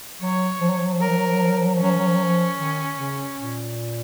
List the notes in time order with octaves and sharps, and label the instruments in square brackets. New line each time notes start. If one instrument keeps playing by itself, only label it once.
[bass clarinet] F#3 [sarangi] C#5
[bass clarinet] F3
F#3
F3
F#3
F3
[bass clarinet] F#3 [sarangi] A#4
[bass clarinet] F3
F#3
F3
F#3
F3
F#3
F3
F#3
F3
[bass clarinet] F#3 [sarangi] C#4
[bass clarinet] F3
F#3
F3
F#3
F3
D#3
C#3
A#2